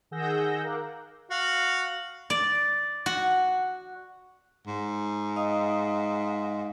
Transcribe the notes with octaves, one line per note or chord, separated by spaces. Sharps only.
D#3 G#4 F#5 E6 G6 A#6
A#4 F5 D6 F#6
F#4 F5
D5
F#4
G#2
D#5 F5 D#6